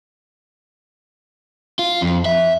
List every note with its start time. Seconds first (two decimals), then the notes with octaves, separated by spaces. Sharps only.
1.79 F4
2.02 F2
2.25 E5